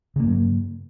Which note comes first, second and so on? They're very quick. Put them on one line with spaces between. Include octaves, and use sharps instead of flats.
C#3 A#3 G2 F#3